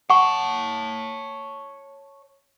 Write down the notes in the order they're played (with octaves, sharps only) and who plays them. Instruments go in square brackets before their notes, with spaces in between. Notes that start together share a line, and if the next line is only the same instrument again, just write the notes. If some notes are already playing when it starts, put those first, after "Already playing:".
[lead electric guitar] C#5 A5 [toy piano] F#5 C#6